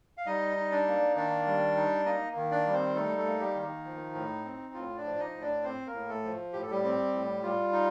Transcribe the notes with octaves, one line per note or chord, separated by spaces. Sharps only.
F5
G3 D#4 D#5
D#4
D4 D5
A#3
D#3 D4 D5
G3
D#4
A#3 D#4 D#5
D#3
D4 D5
G3
C4 C5
A3 D#4 A4
A3 A4
A#3
G3 G4
D#3
D#4
F3
A2
C4
A2 F4
D4 D5
F3
D#4 D#5
A2
D4 D5
C4 C5
A#3 A#4
A2
A3 A4
F3
A2 G4
A4
G3 G4
C4
A2
G3 F4
D#4